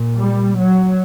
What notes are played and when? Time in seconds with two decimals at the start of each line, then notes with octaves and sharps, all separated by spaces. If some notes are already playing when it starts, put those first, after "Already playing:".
Already playing: A#2
0.17 G3
0.57 F#3